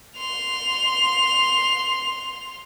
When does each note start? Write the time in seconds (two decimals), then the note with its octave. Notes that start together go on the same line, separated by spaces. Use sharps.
0.17 C6 F7